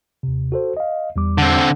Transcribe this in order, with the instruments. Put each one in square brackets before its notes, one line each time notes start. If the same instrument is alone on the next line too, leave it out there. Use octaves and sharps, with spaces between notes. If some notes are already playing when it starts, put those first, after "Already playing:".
[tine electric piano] D#2 C3
F#4 A4 C5
D#5 F5
E2 G3 D6
[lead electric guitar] D3 C4